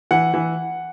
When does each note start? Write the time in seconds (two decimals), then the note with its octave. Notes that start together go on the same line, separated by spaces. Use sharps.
0.11 E3 F#5
0.34 E3